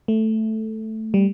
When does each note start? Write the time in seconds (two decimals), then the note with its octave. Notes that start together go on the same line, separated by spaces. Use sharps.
0.08 A3
1.14 G3